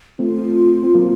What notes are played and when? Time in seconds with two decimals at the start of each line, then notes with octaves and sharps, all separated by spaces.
0.19 A3 C4 F4
0.83 C4
0.95 F#3 A#3